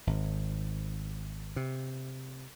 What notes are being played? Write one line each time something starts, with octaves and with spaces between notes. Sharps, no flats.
G#1
C3